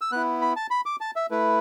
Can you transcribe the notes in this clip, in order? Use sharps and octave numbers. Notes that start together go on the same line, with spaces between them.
E6
B3 E4 F#6
B5
A5
B5
D6
A5
E5
A3 E4 B4